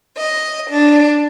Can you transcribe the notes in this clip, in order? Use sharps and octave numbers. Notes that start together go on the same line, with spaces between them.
D#5
D4